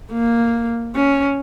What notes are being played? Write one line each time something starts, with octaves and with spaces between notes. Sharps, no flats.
A#3
C#4